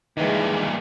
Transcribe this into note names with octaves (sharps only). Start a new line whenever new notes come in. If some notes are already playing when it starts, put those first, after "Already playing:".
G2 A#2 D#3 E3 G#3